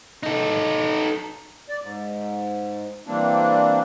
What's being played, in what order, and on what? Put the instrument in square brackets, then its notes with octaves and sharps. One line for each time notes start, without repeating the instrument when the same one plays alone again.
[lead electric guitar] D#4 A4
[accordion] D5
G#2
E3 G3 A#3 C4 D4